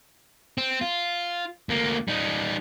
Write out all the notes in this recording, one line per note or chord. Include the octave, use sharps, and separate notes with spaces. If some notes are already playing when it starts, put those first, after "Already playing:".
C4
F4
D2 A#3
G3 D#4